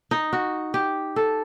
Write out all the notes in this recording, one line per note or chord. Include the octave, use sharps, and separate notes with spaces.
D#4
F#4
G4
A4